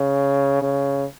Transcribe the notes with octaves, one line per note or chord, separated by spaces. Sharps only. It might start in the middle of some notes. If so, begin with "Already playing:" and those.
Already playing: C#3
C#3